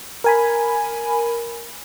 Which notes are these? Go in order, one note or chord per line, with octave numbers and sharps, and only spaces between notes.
A#4 G#5 B5